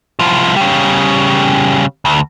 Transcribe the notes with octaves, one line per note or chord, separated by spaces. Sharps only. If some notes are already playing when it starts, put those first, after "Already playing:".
C2 F3
C#3 G3
D2